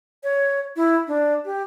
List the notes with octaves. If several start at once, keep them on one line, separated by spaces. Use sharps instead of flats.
C#5
E4
D4
G4